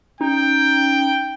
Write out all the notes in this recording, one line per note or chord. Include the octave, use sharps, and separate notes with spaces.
C#4 D#4 G5